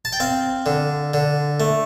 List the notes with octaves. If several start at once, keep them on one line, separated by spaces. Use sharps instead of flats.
A5
G5
C4 F5
D3
D3
A3